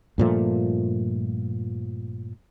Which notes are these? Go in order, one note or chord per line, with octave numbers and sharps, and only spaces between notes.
G2 A#2 F3 A3